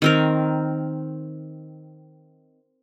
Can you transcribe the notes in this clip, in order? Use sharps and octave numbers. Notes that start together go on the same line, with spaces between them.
D#3 C4 A#4